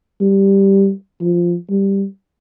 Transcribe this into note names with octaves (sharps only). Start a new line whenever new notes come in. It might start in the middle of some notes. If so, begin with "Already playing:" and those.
G3
F3
G3